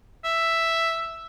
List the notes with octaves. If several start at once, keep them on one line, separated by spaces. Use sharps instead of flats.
E5